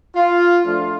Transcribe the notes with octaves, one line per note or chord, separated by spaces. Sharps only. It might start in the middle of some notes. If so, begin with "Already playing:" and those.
F4
F3 A3 D4 F4